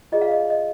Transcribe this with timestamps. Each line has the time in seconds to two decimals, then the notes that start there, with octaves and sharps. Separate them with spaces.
0.12 F4 G#4 D5 D#5
0.22 F5
0.31 D#5
0.50 D#5